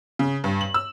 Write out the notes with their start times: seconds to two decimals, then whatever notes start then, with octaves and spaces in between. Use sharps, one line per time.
0.19 C#3
0.44 G2
0.61 F#7
0.74 E6